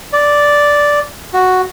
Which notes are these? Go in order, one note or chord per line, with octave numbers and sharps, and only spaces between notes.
D5
F#4